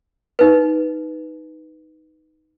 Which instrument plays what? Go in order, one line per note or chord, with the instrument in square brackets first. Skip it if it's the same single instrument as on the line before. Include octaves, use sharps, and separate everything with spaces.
[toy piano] D#4 B4